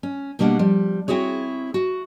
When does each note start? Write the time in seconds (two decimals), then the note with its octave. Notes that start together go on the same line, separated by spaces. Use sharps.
0.03 C#4
0.39 B2 G3 A#3 D4 F5 F#5
0.59 F3 G3
1.08 C4 E4 F#4 G#4 C#5
1.74 F#4